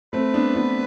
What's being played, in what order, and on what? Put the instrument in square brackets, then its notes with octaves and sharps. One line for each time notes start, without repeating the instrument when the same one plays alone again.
[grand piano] A3 C4 [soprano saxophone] B4
[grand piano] B3 D4
B3 D4